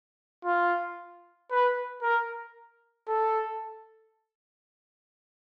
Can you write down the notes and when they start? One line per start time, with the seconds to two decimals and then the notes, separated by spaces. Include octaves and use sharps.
0.45 F4
1.51 B4
2.02 A#4
3.08 A4